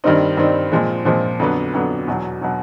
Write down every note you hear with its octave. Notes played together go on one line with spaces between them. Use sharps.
G2 D#3 G3 C4 D#4
G2 D#3 G3 C4 D#4
A#2 F3 G#3 C4
A#2 F3 G#3 C4
F2 D3 F#3 B3
F2 D3 F#3 B3
E2 B2 F#3
B2 F#3